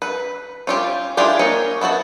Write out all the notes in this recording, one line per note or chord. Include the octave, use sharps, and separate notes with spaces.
B4
C#4 F4 G4
D4 E4 F4 G4 G#4
A#3 C#4 C#5 D#5
B3 E4 F#4 A5